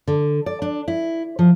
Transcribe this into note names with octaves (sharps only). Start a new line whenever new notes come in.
D3
D5
D4
E4
F3